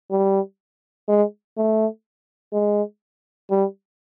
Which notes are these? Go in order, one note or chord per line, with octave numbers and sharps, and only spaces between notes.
G3
G#3
A3
G#3
G3